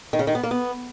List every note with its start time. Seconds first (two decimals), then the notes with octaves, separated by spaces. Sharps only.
0.13 D#3
0.19 C#3
0.27 D#3
0.35 B3
0.43 A#3
0.51 B3